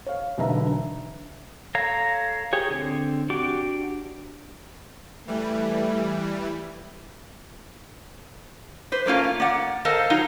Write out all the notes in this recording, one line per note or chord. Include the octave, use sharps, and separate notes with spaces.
C#5 F5
E1 B1 D3 B4 E5 A#5
A4 C#5 F5 A#5
G4 G#4 C#5
D3 C4
D4 F#4 G4 D6
E3 G3 A3
B4 C5
A3 A#3 C#4 F4
A#3 D5 F#5
A4 A#4 C5 D#5 F5 A5
F#3 D#4 F4